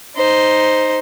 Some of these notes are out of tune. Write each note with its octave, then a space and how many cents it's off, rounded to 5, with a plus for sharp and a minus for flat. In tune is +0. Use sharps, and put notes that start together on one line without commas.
D#4 +0 C5 +0